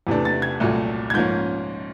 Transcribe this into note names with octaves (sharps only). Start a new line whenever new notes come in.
E2 C3 E3 A3 D4
A6
G#6
C2 A#2 F#3 A3
G#6
G#2 F3 A#3 C#4 G6